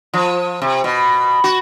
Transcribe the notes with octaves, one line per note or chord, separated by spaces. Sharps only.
F3
C3
B2
F#4